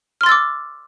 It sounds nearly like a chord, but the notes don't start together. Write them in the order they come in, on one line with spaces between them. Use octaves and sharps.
F6 C6 A6 E6 D6